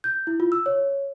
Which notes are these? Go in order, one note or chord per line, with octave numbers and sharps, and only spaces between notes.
G6
E4
F4
E6
C#5